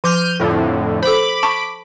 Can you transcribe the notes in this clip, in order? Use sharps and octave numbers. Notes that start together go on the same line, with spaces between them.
F3 D6 F6 G6 D#7
F2 A2 D3
A4 C5 B5 D6
A5 C#6